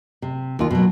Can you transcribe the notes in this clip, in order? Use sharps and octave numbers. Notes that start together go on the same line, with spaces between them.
C3
D#2 F4
B2 F#3